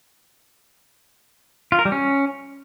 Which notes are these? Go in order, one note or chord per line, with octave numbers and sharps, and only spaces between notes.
F4
A#4
G3
C#4